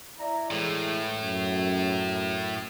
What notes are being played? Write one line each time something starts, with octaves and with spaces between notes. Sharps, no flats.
E4 D5 A#5
A2 E3 G#3
F#2